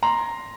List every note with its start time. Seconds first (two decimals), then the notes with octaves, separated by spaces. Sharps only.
0.03 A#5 C6